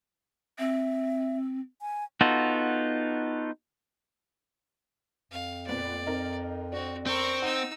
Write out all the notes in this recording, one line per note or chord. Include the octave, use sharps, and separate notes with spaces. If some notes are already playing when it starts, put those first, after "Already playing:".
C4 E5
G#5
B3 D#4 F4 F#4 A4
F2 F5
A#2 B3 C4 D5
C4 D#4 A#4
C4 D4 F#4
C4 A#4 C#6
D#4 F#5 E6